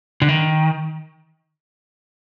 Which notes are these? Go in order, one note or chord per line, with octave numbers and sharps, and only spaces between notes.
D3
D#3